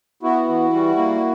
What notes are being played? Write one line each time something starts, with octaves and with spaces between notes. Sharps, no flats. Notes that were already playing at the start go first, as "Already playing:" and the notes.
B3 E4 F#4
E3
G3
A#3